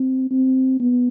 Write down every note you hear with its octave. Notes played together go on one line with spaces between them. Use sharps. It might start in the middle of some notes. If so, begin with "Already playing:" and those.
Already playing: C4
C4
B3